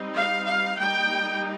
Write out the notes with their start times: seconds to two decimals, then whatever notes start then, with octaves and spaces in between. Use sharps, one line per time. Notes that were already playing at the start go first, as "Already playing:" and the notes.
Already playing: G3 C4 D#4
0.13 F5
0.46 F5
0.77 G3 A#3 D#4 G5